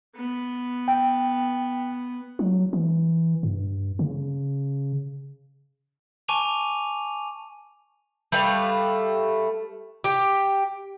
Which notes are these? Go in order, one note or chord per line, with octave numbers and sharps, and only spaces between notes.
B3
G5
F#3
E3
G2
C#3
G#5 A5 C#6 D6 D#7 F7
G3 A3 B4 F5
G4